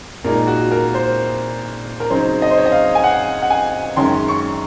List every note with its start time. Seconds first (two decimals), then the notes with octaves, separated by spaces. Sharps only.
0.24 A#2 G#3 D#4 A#4
0.47 F#4
0.71 A#4
0.94 C5
2.00 A#4
2.10 C#3 F#3 C4 D#4 C5
2.42 D#5
2.50 C5
2.58 C#5
2.66 D#5
2.72 F5
2.95 G#5
3.04 F#5
3.42 F#5
3.50 G#5
3.96 F#2 D#3 G#3 C#4 C6
4.28 C#6